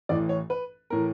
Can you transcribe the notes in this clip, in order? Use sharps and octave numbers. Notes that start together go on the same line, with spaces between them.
A1 A2 E3 D5
C#5
B4
A2 E3 A#4